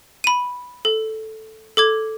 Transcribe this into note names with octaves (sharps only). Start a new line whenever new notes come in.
B5 D#7
A4
A4 D6 G#6